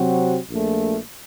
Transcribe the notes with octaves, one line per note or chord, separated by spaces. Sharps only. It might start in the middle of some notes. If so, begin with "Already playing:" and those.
Already playing: C3 F#3 C4 F#4
A#1 A#2 A3